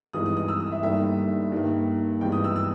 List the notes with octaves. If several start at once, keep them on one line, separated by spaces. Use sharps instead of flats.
G#1 G2 E3 G#3 B3 D#6
D#6
D#6
E6
D#6
E5
G1 G2 D#3 G3 A#3 E5
G2 D#3 A#3
G#1 G2 E3 G#3 B3 G5
D#6
E6
E6